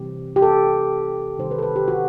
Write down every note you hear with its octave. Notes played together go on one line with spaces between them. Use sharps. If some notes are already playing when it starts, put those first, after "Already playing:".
Already playing: C3 E3 G3 C4 G4
G4
A4
C3 D#3 G3 C5
B4
A4
B4
G4
F#4